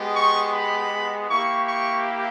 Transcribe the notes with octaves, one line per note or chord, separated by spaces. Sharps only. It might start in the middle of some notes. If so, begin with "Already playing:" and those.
Already playing: G#3 B3 G4
C#6
B5
A#3 E4 G4 C#6
C#6